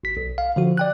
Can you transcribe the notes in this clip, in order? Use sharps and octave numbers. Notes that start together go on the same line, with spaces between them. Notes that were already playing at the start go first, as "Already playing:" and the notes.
G#1 B6
B1
F5
D3 F3 F#4
D5 G5 F#6